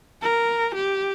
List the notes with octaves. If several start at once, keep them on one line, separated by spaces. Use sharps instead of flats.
A#4
G4